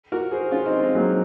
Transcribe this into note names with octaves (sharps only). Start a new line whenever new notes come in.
F#4 A#4
G#4 C5
C#4 F4
C4 D#4
G#3 C4
F#3 A#3